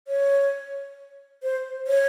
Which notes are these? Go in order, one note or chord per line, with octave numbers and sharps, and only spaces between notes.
C#5
C5
C#5